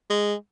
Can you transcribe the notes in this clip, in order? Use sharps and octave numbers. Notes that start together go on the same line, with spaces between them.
G#3